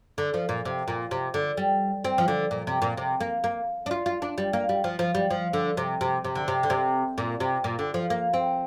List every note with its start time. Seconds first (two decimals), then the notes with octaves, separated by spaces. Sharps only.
0.18 D3
0.34 F3
0.49 A#2
0.65 C3
0.88 A#2
1.11 C3
1.34 D3
1.57 G3
2.04 C4
2.18 F3
2.28 D3
2.51 A#2
2.67 C3
2.82 A#2
2.97 C3
3.20 A#3
3.44 A#3
3.86 D4
3.91 F4
4.06 F4
4.22 D4
4.38 G3
4.53 A#3
4.69 G3
4.84 F3
4.99 F3
5.15 G3
5.30 F3
5.53 D3
5.77 C3
6.01 C3
6.25 C3
6.35 D3
6.48 C3
6.63 D3
6.70 C3
7.18 A#2
7.40 C3
7.64 A#2
7.79 D3
7.94 F3
8.10 A#3
8.34 C4